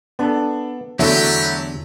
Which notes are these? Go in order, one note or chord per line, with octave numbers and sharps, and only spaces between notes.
B3 D4 A4
E2 D3 F#3 A3 D4 E4 G4 A4